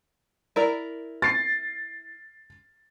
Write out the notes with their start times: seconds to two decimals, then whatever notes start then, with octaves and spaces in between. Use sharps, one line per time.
0.56 E4 A#4 D5
1.22 A6 C7